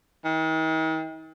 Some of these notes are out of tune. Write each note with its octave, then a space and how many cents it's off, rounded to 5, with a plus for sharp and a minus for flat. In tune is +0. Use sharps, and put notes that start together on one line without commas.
D#3 +45